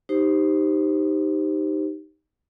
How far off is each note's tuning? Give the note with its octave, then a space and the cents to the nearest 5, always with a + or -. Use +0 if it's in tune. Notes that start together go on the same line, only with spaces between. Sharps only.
D#4 +0 G4 +0 C5 +0